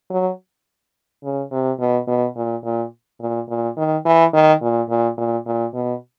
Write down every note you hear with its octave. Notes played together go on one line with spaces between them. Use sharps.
F#3
C#3
C3
B2
B2
A#2
A#2
A#2
A#2
D#3
E3
D#3
A#2
A#2
A#2
A#2
B2